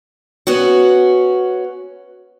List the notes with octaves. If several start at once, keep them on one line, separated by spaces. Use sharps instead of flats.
B3 C#4 F#4